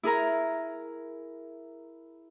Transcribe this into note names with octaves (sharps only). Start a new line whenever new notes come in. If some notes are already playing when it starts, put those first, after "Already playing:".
E4 G#4 A#4 A#5